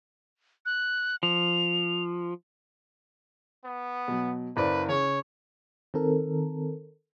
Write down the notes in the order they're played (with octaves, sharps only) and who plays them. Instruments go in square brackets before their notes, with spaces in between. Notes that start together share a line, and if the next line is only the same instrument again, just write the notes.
[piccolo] F#6
[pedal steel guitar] F3 [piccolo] F7
[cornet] B3
[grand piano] B2 F#3
[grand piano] F#1 C5 D5 [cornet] B4
[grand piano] C#3 [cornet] C#5
[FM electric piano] D#3 C4 A4 A#4